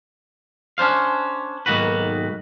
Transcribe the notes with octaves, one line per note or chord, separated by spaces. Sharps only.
C#4 D4 C5 F5
B1 G#2 D#3 A#3 F#4 B4